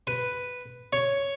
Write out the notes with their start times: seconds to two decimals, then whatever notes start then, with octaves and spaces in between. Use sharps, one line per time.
0.07 B4
0.93 C#5